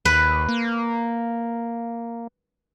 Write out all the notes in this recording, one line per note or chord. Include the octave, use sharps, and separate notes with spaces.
D#2 B4
A#3